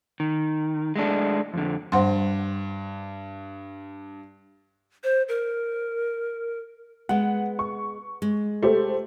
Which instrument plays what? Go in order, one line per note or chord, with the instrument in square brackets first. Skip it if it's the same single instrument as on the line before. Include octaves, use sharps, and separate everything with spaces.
[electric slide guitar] D#3
G#3 A3 D4
F2 D3
[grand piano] G2 [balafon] C5 F#5 C6
[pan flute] C5
A#4
[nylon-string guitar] G#3 B3 [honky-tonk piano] F#5
[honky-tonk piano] C#6
[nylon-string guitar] G#3
[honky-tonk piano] A3 G4 C5